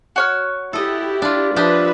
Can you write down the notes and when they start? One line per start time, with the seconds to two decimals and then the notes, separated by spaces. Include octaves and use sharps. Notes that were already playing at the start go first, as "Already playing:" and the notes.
0.16 F#4 C#5 F6
0.73 E4 G4 A4 D#5
1.22 D4 F4
1.56 F3 D4 G4 B4 D#5 E5